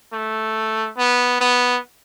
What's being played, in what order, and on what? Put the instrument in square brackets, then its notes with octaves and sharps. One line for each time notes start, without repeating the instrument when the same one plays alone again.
[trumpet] A3
B3
B3